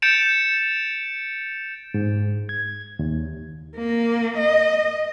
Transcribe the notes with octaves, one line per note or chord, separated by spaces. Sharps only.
G6 A6 C#7 D7 E7 F7
G#2
G#6
D#2
A#3
D#5